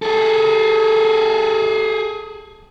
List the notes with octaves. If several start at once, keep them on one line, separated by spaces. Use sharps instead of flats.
G#4 A4